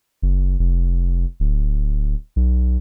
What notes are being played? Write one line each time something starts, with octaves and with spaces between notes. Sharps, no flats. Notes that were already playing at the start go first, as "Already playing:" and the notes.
F#1
F1
D1
B1